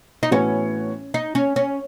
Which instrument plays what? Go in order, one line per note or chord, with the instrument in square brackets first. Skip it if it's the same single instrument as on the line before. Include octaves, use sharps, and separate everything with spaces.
[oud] D#4
[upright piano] A2 E3 B3 F#4 C#5 [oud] C#4
[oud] D#4
C#4
C#4